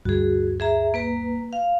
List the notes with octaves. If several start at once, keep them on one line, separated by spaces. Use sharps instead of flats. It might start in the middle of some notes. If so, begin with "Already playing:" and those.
D2 G2 F#4 G#4
G#4 E5 A#5
A#3 B4 A#5
F5